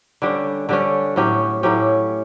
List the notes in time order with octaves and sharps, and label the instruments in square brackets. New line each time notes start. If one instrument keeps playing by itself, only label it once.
[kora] D3 G3 C#4
D3 G3 C#4
A2 F#3 C#4 G4
A2 F#3 C#4 G4